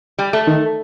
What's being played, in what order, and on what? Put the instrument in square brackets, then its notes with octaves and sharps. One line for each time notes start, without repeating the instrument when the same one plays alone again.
[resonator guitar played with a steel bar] G3
A3
[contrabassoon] D#3